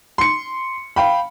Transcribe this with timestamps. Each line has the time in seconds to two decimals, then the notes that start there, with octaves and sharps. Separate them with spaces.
0.18 C6 C#7
0.96 F5 G5 B5